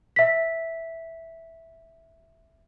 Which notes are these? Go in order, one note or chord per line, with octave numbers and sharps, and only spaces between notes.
E5 B6